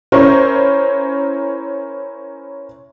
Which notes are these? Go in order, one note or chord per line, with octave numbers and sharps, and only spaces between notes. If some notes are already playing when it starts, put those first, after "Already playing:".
C#4 E4 A#4 C5 C#5